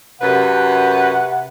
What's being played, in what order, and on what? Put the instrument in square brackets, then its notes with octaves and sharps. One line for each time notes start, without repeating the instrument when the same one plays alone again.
[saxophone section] F#2 B4 [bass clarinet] C3 [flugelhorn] F#5